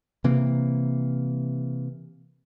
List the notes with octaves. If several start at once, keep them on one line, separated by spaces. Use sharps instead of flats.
C3 E3 A#3